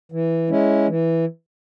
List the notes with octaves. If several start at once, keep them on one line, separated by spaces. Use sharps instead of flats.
E3
G#3 C#4 E4
E3